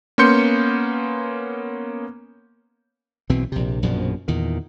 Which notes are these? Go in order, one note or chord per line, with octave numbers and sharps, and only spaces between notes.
A#3 B3 C#4 C6 G6 C#7
B1 B2 E3 C4
A#1 C3
A#1 F#2 B2 F3
E2 A#2 D#3